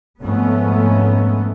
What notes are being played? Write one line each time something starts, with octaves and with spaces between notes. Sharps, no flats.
F2 G#2 A3 B3 C#4